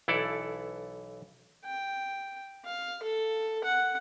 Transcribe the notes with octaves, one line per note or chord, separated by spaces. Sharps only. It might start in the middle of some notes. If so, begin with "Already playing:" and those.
B1 E3 E4 A4 D5 A5
G5
F5
A4
F#5